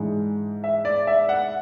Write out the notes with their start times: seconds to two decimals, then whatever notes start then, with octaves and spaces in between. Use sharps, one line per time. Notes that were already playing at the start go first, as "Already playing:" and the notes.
Already playing: G#2 E3 G#3 D4
0.64 E5
0.85 D5
1.07 E5
1.29 F#5